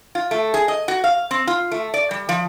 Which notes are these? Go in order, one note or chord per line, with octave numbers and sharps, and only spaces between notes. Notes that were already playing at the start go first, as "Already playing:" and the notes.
F4
A3
G#4
D#5
F#4
F5
C4
F4
A3
D5
G3
F3